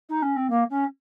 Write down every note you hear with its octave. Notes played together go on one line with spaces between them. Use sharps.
D#4
C#4
C4
A#3
C#4